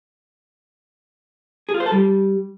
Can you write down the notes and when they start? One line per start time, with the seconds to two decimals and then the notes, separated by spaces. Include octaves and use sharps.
1.69 G#4
1.74 F4
1.80 C5
1.86 A4
1.92 G3